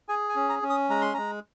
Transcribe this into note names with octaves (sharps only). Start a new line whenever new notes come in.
G#4 G#5
G#5
C#4
A#5
C#4
D#6
G#3 A#5
C6
G#3 A#5